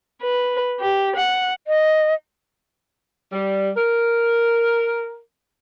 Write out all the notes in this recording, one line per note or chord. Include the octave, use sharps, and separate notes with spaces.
B4
G4
F#5
D#5
G3
A#4